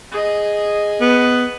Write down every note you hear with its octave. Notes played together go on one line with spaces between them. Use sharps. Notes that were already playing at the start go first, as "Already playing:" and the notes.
G#4 D#5
B3